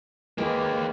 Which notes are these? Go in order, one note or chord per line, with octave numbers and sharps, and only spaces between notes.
G#3 A#3 G4 B4